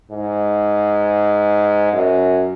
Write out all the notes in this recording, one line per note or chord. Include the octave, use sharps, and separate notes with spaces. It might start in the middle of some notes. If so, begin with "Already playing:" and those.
G#2
F#2